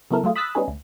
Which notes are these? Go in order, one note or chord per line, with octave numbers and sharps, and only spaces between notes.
C#3 F#3 B3 E4 A4 A#4
F#3 A3 F4 G#4
B5 D#6 E6 F#6 A6 B6
G3 B3 C#4 D#4 G#4
D2